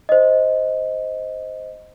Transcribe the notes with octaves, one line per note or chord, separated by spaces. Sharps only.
C5 D#5